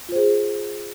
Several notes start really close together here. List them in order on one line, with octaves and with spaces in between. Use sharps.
F4 C5 G#4